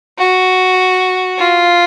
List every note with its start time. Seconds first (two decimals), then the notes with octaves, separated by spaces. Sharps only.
0.18 F#4
1.39 F4